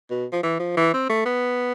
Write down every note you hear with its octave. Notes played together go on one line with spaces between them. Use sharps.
B2
F3
E3
F3
E3
C4
A3
B3